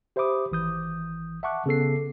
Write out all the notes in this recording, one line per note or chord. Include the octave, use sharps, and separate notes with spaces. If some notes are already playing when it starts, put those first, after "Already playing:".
G4 C5 E5 B5 D6 D#6
G#1 E3 D#6 G6
E5 F#5 A5 C#6 D6 F#6
C#3 B3 A4 C7